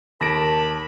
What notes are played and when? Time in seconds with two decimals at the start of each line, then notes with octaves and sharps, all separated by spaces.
0.21 D#2 A#4 A5 B5 A#6 D7